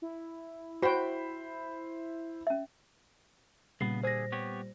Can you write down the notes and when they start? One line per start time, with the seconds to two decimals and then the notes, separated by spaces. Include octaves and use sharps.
0.02 E4
0.82 F#4 C5 G5 B5
2.47 C#4 E5
3.81 A#2 C#3 G3 B3 C7
4.03 D3 G#4 C5 A#6
4.32 B3 G4 C#5